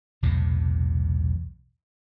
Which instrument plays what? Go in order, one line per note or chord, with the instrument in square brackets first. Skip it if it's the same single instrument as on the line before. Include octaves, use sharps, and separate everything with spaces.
[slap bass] B1 E2 A2 C3